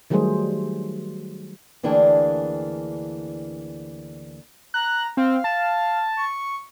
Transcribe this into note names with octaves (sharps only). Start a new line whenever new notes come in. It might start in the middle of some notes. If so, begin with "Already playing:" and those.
D#3 F#3 G3 A3 G#4 C5
D2 E3 A#3 D4 G#4 G5
A#5 F#6
C4 F5
A5
C#6